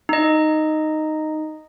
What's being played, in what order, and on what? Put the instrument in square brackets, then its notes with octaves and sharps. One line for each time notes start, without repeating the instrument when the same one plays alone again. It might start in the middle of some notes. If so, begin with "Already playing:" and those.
[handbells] D#4 D#5